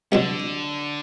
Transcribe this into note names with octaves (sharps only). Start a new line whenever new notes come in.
C2 B2 D3 F#3